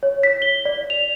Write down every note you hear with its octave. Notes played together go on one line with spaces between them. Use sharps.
C#5
B6
G7
D5
F7